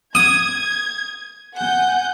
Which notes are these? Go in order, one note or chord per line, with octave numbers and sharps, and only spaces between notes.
D#6 G#6
F#5 G#5 G6